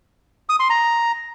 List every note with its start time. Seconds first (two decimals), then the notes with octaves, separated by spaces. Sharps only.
0.49 D#6
0.60 C6
0.70 A#5